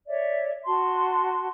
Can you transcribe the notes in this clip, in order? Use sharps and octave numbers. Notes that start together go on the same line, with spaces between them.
C#5 D5 E5
F#4 A5 C6